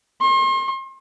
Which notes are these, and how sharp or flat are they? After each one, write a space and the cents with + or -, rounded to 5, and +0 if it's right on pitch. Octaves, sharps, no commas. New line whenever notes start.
C6 +40